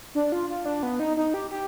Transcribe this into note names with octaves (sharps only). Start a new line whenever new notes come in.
D4
F4
F4
D4
B3
D#4
D#4
G4
G4